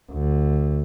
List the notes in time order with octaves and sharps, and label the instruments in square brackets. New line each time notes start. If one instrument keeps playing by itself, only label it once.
[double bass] D2